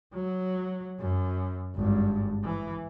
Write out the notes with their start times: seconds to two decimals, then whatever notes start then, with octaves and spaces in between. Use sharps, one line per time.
0.14 F#3
1.00 F#2
1.75 G#1 G2
2.43 E3